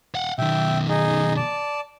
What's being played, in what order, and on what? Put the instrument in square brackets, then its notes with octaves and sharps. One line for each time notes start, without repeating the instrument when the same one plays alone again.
[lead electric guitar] F5 F#5
[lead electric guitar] B1 D#3 [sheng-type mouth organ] E5 G5
[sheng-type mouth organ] D#4 G#4 D#5
D5 A5